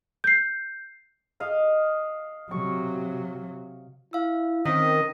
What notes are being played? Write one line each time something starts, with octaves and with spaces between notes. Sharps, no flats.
G6 C7
D#5 F5
C3 F#3 C#6
E4 F5 E6
D#3 C4 C#4 D#5 B6